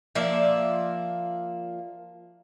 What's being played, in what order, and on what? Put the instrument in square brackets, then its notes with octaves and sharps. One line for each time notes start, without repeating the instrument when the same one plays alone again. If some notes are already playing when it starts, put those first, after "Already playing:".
[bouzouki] F3 A#3 D5 E5